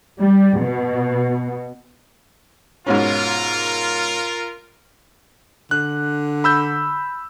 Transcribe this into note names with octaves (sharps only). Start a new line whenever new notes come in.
G3
B2
G#2 B2 C#4 F4 A#4
D3 F#6
B5 E6 G6